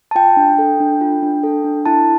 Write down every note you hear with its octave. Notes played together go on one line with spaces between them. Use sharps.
A5
F4 G5
D4
A4
D4
F4
D4
A4
D4
E4 A5